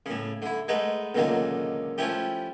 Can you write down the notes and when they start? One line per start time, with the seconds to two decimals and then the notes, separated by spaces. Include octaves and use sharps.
0.06 A2 C#3
0.42 D3 E4
0.68 G#3 A3 D#4 B4 F#5
1.15 C#2 A#2 D3 D#3 F#3 A#3
1.98 F3 A3 C#4 E4 G4